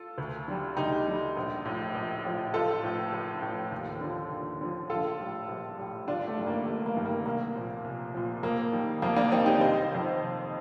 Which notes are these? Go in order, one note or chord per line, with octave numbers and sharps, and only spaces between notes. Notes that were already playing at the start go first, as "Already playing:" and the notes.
Already playing: F4 A4
D2
D3 G3
D2 D#4 G4
D3 G3
A#1
A2 F3
A#1
A2 F3
A1 F4 A4
A2 F3
A1
A2 F3
D#2
D3 F3
D#2
D3 F3
A#1 F4 A4
A2 G3
A#1
A2 G3
G1 D4 F4
A3
G2 D#3 G3
A#3
G1 A3
A#3
G2 D#3 G3
A#3
C2 A#3
A#2 F3
C2
A#2 F3
F2 A#3
D#3 G3
F2 A#3
A#3 D4
D#3 G3 C4 D#4
D#4 G4
F1 C5 D#5
F2 D#3
F1